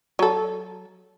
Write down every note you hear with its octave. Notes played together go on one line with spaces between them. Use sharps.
F#3 A4